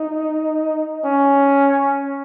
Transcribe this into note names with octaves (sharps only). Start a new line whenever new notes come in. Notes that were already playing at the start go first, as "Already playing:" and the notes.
Already playing: D#4
C#4